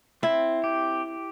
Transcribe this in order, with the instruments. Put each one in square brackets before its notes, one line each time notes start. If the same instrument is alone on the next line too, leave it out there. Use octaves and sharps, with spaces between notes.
[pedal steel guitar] C4 [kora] E4
[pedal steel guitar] G4